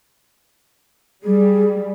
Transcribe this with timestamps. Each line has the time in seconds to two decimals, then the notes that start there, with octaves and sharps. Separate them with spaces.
1.23 G3 G#4